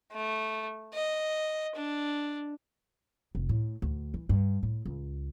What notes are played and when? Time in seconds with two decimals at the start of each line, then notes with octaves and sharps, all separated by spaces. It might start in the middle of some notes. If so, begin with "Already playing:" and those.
0.12 A3
0.94 D#5
1.76 D4
3.35 F1
3.49 A2
3.82 D2
4.14 E3
4.29 G2
4.63 A2
4.86 C#2